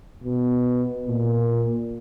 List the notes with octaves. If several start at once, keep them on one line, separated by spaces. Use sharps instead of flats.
B2
A#2